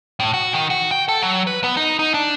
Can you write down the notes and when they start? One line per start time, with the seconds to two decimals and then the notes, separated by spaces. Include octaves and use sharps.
0.20 A2
0.34 F#4
0.54 D#3
0.70 F#4
0.91 G5
1.08 A4
1.23 F#3
1.47 B4
1.64 B3
1.77 D#4
1.99 D#4
2.14 D4